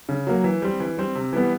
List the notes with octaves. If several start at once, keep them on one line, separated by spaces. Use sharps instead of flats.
C#3
F#3 A#3
E3
G3 C4
E3
G3 C4
C3
E3 G3 B3